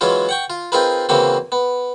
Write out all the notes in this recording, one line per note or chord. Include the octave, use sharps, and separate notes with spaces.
E3 F#3 G#3 C#4 F4
F#5 G5 C#6
F4
C4 D#4 F4 G#4 A#4 B4
C#3 E3 A#3 C4 F#4
B3